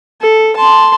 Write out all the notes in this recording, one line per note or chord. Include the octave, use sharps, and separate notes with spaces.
A4
A5 C6